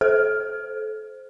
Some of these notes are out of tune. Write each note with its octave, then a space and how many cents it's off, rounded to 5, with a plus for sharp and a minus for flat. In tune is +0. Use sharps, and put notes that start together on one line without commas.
A4 -25 C5 +0